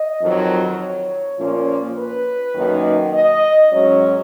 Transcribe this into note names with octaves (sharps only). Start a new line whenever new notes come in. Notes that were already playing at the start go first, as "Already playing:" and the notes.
Already playing: D#5
F2 D#3 F#3
C#5
A#2 F3 A#3 C#4
B4
F#2 D#3 A#3 D#4
D#5
G#2 F#3 C#4 C#5